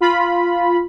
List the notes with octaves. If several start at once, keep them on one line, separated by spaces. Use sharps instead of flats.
F4 B5